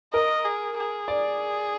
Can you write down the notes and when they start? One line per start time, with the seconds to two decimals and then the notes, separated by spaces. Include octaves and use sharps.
0.14 A#4 D#5
0.45 G#4
0.77 G#4
1.08 D5